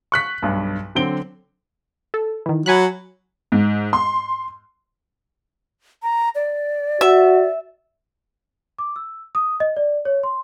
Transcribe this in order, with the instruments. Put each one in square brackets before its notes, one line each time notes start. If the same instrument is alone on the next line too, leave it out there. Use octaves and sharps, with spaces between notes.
[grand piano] C#6 F#6 B6
B1 G2
D3 F#3 C4 D7 G7
[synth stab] A4
D#3 E3
[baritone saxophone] F#3 [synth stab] G#5 B5 F#6
[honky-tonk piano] G#2
C6
[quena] A#5
D5
[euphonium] F#4 [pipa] E5
[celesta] D6
E6
D#6
D#5
D5
C#5
C6